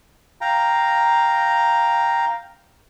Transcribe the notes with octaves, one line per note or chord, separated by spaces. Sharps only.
F5 G5 A#5